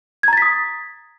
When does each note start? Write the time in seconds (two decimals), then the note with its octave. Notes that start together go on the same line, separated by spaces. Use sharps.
0.23 G#6
0.28 A#5
0.33 A6
0.37 B6
0.42 D#6